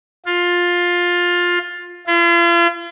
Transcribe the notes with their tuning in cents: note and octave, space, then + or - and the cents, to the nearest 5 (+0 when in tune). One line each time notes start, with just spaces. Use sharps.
F4 +15
F4 -40